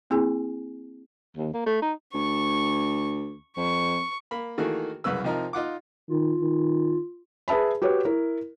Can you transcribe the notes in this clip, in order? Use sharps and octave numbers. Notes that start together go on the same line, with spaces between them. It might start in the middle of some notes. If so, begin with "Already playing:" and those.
A#3 C4 E4 G#4 G#5
D#2
A#3
A3
D#4
D2 C#6
F2 C#6
A#3 B5
D#3 E3 A3 A#3 F#4 G#4
C2 F#2 C#3 B4 E6
C3 F3 D#4 A#4
D#4 F4 F#5 D6
D#3 F4
D#3
G#4 B4 E5 A5 B5
F#4 G4 B4 C#5
E4 A#4